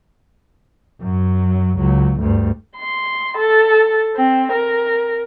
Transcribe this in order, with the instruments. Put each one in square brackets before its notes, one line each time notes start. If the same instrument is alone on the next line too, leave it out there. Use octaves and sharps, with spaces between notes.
[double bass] F#2 F#3
C#2 F#3
D2 G2
[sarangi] C6
A4
C4
A#4